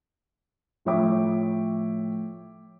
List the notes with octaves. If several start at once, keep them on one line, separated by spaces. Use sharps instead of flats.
A2 F3 C#5 E5 G5 D6